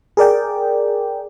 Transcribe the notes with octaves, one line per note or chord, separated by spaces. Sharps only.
G#4 A#4 D5 G5